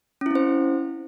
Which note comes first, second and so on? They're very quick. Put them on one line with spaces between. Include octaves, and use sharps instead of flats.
C#4 E4 C4 C5